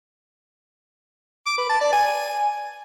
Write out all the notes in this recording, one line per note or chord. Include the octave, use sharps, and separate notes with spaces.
D6
B4
A5
D5
G#5